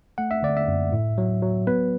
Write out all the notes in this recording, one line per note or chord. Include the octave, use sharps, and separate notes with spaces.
A3 F#5
E5
D3 D5
E5
F#2
A2
F#3
F#3
B3 B4